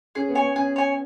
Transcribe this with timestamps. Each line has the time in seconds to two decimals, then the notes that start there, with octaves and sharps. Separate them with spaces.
0.15 C#4 G#4
0.28 B3
0.35 C#5 G#5
0.42 B3
0.56 C#4 G#4
0.76 C#5 G#5